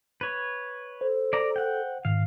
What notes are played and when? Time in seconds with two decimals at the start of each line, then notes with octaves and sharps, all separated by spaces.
0.21 B4 C#5
1.01 A4 C5
1.33 D5 A#5
1.56 F#5 G5
2.05 G#2 D#3 F5